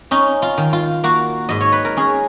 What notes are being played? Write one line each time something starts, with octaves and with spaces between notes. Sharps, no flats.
C#4 D#4
F4
D#3
F4
A#3 F#4
G#2 D#5
C#5
B4
A#4
C#4 G#4